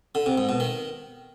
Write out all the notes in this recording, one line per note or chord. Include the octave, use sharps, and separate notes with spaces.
D3
C3
G#2
B2
D#3